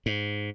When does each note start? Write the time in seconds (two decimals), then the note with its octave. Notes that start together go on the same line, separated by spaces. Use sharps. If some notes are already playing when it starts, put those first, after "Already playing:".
0.06 G#2